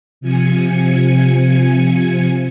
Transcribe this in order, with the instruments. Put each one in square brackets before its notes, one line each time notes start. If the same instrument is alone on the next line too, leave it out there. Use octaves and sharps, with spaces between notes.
[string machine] C3 F3 G#5 C#7